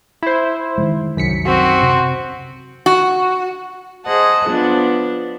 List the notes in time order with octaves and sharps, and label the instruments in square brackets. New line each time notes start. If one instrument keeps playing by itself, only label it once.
[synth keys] E4 C5
[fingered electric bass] D#3 F3 G#3
[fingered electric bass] C2 D#3 [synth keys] F#2 B6 C#7
[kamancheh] C4 F#4
[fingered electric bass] C3
[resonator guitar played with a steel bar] F#4
[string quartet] G#4 C5 D#5 F#5 A5
F3 B3 D4